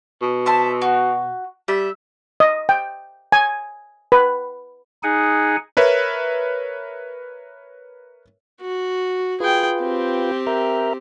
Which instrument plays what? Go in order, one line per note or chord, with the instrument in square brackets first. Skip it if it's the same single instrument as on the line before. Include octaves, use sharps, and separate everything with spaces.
[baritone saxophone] B2
[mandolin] C5 E5 A5
F#4
[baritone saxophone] G3 [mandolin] E5
[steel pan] D#5
G5
G#5
B4
[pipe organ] D#4 G#4 F#5 G#5
[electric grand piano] A#4 B4 C#5 E5
[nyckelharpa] F#4
[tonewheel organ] F4 B4 [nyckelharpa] G#4 G5
[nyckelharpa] C4 G4
[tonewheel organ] A#4 E5 A#5